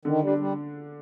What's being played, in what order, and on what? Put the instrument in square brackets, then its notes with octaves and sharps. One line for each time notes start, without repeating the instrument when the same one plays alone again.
[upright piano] D3 [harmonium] D#3
[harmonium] G3
[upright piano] D4
[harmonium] G3